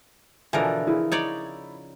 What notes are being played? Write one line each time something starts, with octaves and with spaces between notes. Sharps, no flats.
B2 D3 E3 F3 A#4 G#5
C#3 E4
D#4 C#5 D5